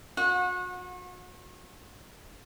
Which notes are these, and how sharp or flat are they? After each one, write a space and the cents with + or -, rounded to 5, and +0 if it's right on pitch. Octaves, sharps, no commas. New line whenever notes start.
F#4 -40 F#5 -25